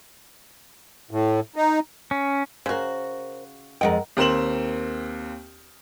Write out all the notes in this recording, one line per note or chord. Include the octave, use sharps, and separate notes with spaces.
A2
D#4
C#4
C#3 F#4 A#4 C5
F2 G#3 A#4 D#5 F#5 G5
D#2 C4 A#4 C6 E7 F#7